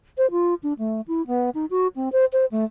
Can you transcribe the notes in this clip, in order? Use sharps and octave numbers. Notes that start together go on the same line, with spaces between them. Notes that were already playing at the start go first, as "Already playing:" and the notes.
C5
F4
D4
A3
E4
B3
D#4
F#4
C4
C5
C5
A3